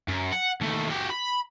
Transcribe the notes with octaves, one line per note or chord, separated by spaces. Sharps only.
F#2
F#5
D#2 A3
F#4 G4
B5